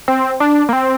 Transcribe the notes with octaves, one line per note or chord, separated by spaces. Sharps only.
C4
D4
A#3
C4